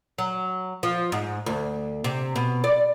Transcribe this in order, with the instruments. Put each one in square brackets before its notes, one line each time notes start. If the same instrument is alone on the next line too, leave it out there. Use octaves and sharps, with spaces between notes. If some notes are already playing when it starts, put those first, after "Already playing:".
[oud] F#3
F3
G#2
D2
C3
B2
D5